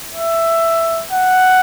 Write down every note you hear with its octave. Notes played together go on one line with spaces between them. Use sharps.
E5
F#5